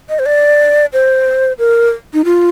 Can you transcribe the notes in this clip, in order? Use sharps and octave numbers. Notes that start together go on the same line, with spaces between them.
D#5
C5
D5
C5
A#4
D#4
F4